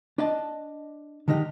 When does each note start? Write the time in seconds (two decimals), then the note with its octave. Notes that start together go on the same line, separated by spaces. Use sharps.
0.18 D4 D#5 A5
1.28 D3 D#3 G#3 D#4 G4